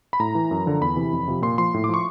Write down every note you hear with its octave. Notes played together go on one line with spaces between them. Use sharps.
B5
A2 A#5
E3
F#2
D3 F3
E2 B5
C3 E3
F2
C3 F3
A#2 C6
F3 C6
A2
D6
F3 C#6